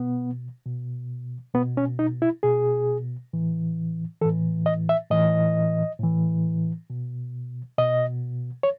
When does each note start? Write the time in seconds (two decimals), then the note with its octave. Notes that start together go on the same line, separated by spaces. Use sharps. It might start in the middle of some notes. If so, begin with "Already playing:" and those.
Already playing: B2 B3
0.66 B2
1.54 B2 B3
1.77 C#4
1.99 D#4
2.22 E4
2.43 B2 G#4
3.33 A2 E3
4.21 E3 A4
4.25 A2
4.66 D#5
4.89 E5
5.10 A2 E3 D#5
5.99 A2 E3
6.90 B2
7.78 B2 D#5
8.63 C#5